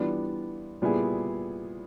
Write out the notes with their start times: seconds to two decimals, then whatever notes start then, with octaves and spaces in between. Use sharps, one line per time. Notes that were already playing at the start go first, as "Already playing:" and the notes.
Already playing: E3 G3 B3 D4 F4
0.82 A#2 G3 B3 E4 G#4